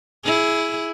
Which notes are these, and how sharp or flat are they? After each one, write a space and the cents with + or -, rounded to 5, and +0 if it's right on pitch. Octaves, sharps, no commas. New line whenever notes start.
E4 +0 G#4 +15